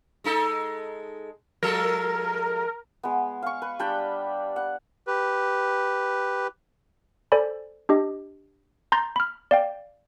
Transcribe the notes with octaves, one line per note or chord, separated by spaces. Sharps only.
G#3 D#4 A4
F3 G#3 A4 A#4
G#3 B3
F5 C#6
B4
G3 D4 D5 G5
F#5
G4 B4
A4 C5 D5 G#5 B5
D4 G4 D#5
A#5 C6 G6 A6
B5 F6
D5 F5 G5